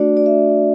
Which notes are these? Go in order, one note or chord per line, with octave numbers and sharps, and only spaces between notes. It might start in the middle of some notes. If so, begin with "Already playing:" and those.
Already playing: A3 D4 F#4 D5
D5
E5